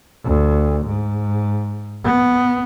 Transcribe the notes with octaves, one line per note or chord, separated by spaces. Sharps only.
D2
G#2
B3